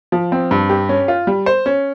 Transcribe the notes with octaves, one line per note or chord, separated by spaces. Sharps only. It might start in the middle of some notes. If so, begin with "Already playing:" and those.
F3
C4
G2
G4
C#4
F4
G3
C5
C#4